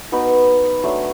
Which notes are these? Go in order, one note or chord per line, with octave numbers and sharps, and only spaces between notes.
B3 D#4 F#4
F#3 A3 D4